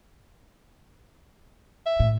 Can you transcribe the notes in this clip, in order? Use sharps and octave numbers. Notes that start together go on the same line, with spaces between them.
E5
A2